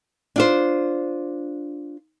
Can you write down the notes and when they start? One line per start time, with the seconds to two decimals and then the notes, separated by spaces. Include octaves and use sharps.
0.36 D4 F4 C5